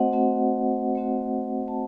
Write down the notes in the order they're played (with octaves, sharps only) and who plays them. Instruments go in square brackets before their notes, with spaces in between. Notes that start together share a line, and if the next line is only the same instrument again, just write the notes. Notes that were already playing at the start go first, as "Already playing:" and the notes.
Already playing: [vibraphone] A3 C4 F#4 C5 D#5 F#5
A3 C4 F#4
A3 C4 F#4
A5